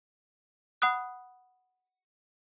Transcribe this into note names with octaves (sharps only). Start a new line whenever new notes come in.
F#5 B5 D#6 F#6